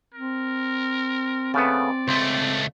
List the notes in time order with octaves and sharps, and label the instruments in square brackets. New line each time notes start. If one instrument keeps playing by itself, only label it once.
[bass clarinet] C4 [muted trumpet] A#4
[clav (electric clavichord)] C#3 A3 B3 [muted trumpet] D5
[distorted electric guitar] C#2 A3 [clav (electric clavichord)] C5